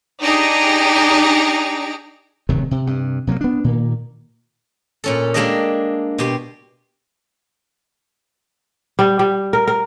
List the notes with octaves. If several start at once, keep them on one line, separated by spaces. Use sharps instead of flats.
D4 D#4 G4 G#4 A#5 D7
D1 C3 D#3 F#3
C3
G2 C3
C3 F#3 A3 A#3
B3 D4
A#2 D#3 A#3
A#2 C#4 A4
G#3 A#3 D4 G4 A4 D#5
B2 G4 C6
G3
G3
A#4
A#4